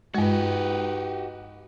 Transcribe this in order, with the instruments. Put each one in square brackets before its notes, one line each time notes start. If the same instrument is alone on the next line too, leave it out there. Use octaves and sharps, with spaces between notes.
[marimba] G2 G#3 [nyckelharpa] D#4 B4 [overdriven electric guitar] F#4 G4